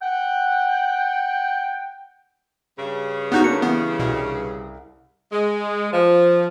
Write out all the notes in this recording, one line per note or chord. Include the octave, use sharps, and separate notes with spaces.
F#5 G5
G2 C#3
B3 D#4 F#4 F#5 F#6 G6
A#3 C#4 D4 C#7
E3 B3
C2 B2
G#3
F3